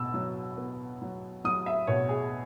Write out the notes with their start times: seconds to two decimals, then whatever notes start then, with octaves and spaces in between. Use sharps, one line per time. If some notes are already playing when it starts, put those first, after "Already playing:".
Already playing: B2 E6
0.14 F#3
0.57 B3
1.02 F#3
1.44 F#3 D#6
1.66 E5
1.87 B2 C#5
2.09 G#4